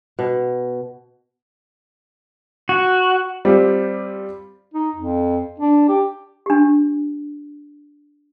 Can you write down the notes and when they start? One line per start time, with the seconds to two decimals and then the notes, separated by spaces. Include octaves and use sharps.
0.19 B2
2.69 F#4
3.45 G3 C4 F4 G4
4.74 D#4
4.95 F2
5.60 D4
5.89 G4
6.46 D4 G4